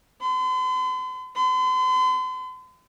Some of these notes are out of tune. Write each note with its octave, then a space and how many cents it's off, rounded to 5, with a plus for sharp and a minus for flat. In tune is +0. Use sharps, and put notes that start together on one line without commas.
C6 -45
C6 -45